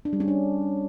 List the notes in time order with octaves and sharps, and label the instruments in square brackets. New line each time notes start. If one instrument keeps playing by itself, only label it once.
[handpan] D4
G3
C#4
D4